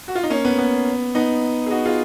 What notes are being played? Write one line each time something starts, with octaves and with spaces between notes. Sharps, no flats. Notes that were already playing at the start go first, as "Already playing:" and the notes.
F#4
F4
D#4
A#3 C#4
B3
B3
B3 D#4
G#4
D#4 F#4
F4 G#4